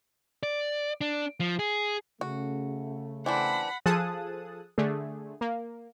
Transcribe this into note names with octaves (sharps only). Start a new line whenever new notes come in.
D5
D4
F3
G#4
C#3 A3 F#4
E3 C4 D4 F#5 B5
F3 G#4 A4 A5 D#6 F#6
D3 A3 G#4
A#3